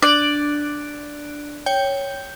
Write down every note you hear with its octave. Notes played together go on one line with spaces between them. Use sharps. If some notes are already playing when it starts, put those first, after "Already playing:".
D4 D5 F#6 D7
C#5 G5 G6